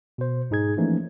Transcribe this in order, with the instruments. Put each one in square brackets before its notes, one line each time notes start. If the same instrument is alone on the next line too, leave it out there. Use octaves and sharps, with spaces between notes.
[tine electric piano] B2 C5
G#2 D#4 G#4 G#6
E3 F3 A3 A#3 C#4 D#4